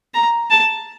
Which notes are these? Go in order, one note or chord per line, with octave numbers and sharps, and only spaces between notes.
A#5
A5